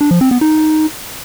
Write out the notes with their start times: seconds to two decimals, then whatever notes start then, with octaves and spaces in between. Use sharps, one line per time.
0.01 D4
0.11 F3
0.21 C4
0.31 B3
0.41 D#4